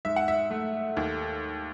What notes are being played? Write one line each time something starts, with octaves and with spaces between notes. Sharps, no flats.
G#2 E5
F#5
E5
A3
D#2